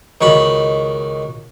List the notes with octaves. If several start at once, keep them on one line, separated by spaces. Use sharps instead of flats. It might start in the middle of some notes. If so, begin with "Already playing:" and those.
C#2 D#3 F#4 B5